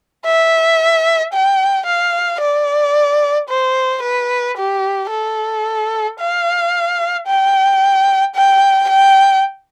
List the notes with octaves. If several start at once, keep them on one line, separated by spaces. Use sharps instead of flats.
E5
G5
F5
D5
C5
B4
G4
A4
F5
G5
G5
G5